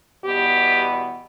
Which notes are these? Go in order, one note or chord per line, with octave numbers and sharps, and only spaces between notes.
E2 B2 G3 B3 G4